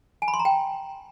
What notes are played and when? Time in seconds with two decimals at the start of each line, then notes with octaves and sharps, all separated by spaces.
0.22 G#5
0.28 B5
0.34 C6
0.39 A#5
0.45 G5